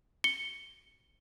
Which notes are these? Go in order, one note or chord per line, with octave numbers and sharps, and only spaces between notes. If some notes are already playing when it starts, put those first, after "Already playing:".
C#7 G7